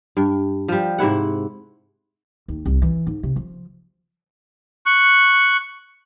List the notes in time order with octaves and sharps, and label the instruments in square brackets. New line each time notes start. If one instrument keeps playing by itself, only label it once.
[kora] G2
F3 G3
G#2 C3 E4 F#5
[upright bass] D#2
C2
E3
G#2
C3
F3
[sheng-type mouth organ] C#6 F#6